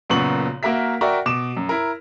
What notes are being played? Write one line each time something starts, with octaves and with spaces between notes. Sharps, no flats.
F#1 F#2 A#2 B3 C#6 F#7
A#3 F#4 A#4 E5 B6
F#4 A#4 D5 E5 G5 C#6
B2 D6 E7
F#2
E4 A#4